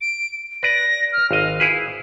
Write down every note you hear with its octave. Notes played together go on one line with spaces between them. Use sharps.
D7
B4 D5 A#6
F6
G#1 D#5 F5
E4 G#4 B4